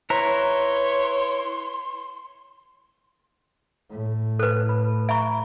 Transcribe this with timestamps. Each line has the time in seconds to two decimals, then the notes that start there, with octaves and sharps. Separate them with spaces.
0.10 E4 B4 C#5 A#5 C6
3.90 A2
4.39 A4 B4 F#6
4.69 B5
5.09 E5 A#5 B5 C#6 D7